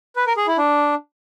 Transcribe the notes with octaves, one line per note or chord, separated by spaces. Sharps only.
B4
A#4
G#4
E4
D4